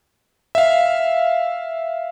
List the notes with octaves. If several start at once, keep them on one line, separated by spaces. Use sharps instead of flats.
E5 F5